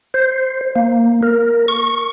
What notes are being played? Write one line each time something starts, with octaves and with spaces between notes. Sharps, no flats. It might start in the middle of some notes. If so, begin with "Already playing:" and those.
C5
A#3
A#4
C#6